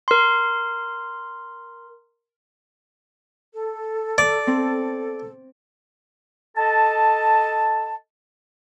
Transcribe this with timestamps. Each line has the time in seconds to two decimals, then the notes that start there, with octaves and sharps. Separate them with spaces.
0.08 A#4 C6
3.53 A4
4.18 D5
4.47 C4
6.57 A4 D#5 A5